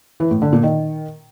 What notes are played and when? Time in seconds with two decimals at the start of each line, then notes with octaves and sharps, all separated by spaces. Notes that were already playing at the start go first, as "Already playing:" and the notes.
0.20 E3
0.31 A2
0.42 D3
0.53 A#2
0.63 D#3